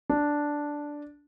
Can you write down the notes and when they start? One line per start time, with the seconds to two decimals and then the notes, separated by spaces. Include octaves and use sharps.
0.10 D4